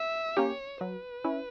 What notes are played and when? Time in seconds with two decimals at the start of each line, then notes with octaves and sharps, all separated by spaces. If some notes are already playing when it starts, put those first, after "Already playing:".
Already playing: E5
0.37 A#3 C#4 G4 C#5
0.80 F#3 B4
1.24 C#4 E4